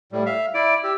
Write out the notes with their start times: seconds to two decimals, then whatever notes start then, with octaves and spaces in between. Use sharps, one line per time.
0.12 A2 G3
0.26 E5 F5
0.54 E4 D5 D7
0.84 G4 E6